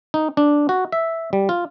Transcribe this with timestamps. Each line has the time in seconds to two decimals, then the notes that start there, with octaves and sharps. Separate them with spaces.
0.14 D#4
0.37 D4
0.69 F#4
0.92 E5
1.33 G3
1.49 F4